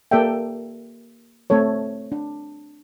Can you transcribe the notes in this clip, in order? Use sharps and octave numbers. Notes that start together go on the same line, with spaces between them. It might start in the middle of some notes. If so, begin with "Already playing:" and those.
A#3 G4 A4 D5 E5 G5
A3 C4 A4 C#5
D4